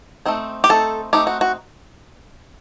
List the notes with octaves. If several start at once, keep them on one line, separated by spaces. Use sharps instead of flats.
A3 C4 D#4
G4
A3 C4 D#4 A4
A3 C4 D#4 G4
F#4
F#4